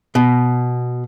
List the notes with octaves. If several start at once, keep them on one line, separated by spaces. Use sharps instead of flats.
B2